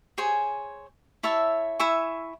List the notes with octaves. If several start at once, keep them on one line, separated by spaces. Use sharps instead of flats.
G#4 C5 C#5 G#5
E4 C#5 E5 A5
E4 E5 G#5 C#6